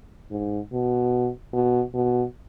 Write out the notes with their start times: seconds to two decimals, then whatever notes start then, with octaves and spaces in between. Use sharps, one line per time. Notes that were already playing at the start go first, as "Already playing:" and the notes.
0.31 G#2
0.72 B2
1.53 B2
1.94 B2